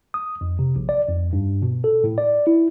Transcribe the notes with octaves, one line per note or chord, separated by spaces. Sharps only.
D#6
F2
C3
A#1
D5
F2
G2
B2
A4
A2
D5
E4